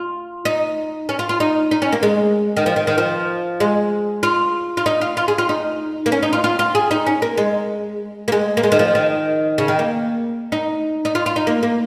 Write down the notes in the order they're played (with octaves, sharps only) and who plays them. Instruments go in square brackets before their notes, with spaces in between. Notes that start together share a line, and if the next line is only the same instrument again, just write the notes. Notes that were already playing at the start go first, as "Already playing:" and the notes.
Already playing: [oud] F4
D#4
C#4
F4
F4
D#4
D#4
C#4
A#3
G#3
D#3
F3
D#3
D#3
F3
G#3
F4
F4
D#4
F4
F4
G#4
F4
D#4
A#3
C#4
D#4
F4
F4
F4
G#4
D#4
C#4
A#3
G#3
A#3
G#3
A#3
G#3
D#3
F3
D#3
C#3
D#3
A#3
D#4
D#4
F4
F4
D#4
A#3
A#3